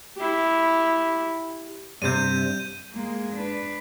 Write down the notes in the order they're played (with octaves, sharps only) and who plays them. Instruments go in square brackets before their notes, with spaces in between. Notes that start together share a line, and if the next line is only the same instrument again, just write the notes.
[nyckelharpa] E4 G4
[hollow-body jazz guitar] G2 C3 [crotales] G6 D#7
[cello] G#3 A#3
D4 B4